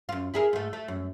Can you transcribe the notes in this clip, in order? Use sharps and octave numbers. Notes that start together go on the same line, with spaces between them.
F#2 F4
E4 G#4 A#4
G#2 A3
A3
F#2